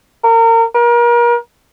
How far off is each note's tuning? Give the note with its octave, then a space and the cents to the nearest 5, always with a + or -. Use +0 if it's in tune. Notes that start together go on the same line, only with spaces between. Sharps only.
A#4 -30
A#4 +35